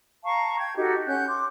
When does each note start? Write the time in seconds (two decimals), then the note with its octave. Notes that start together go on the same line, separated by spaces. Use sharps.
0.25 F5 A5 A#5 C#6
0.58 G5 G#6
0.76 D#4 F#4 G4 A4
1.06 C#4 F#5 F#6 G6
1.27 C6 D6